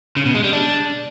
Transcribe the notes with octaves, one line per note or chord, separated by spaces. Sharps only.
C#3
B2
G#3
G3
D4